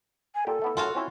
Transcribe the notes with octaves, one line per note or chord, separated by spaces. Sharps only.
G#5
A#2 G4 A4
A3 B3 E4
F#2 A2 F4 F#4 F5
C4 C#4 E4 E5